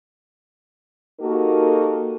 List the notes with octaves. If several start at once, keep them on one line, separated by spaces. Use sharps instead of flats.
A#3 D#4 F#4 G4 A4 A#4